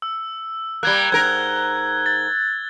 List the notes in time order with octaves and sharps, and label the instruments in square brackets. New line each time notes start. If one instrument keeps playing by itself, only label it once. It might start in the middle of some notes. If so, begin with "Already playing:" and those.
[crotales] E6
[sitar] G3 A#3 [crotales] F#6 G#6 G7
[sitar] G#2 A#4 [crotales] G#6
[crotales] A6